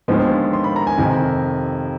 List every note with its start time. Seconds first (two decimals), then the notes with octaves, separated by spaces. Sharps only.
0.08 D#2 D3 F3 G#3 B3
0.53 C6
0.64 B5
0.76 A#5
0.87 G#5
0.98 F2 C3 D#3